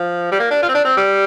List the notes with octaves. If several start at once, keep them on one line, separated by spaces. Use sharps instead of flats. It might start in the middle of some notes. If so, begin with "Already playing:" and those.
Already playing: F3
G3
A#3
D4
F4
C4
D4
C4
G3